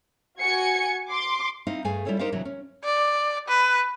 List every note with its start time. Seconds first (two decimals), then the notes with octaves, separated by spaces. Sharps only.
0.41 F#4 G#5 G#6 C#7
1.10 C6 D6
1.67 C4 D#4 E4 F5
1.84 G2 A3 G#4 F5 G#5
2.06 G3 E4 F4 A4 C#5
2.19 D#4 G4 A#4 C5 D#5 F5
2.32 D2 C3 E3 F#3
2.45 C#4
2.84 D5
3.48 B4